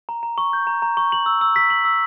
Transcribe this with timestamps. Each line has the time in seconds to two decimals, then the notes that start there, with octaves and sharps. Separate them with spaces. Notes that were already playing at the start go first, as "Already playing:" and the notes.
0.09 A#5
0.23 A#5
0.38 C#6
0.53 G6
0.67 A#5
0.82 A#5
0.97 C#6
1.12 F#7
1.26 E6
1.41 E6
1.56 B6
1.70 F#7
1.85 E6